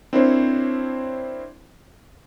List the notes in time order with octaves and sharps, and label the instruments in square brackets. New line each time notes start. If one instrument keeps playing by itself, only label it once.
[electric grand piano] C4 D4 E4 A#4 C5 C#5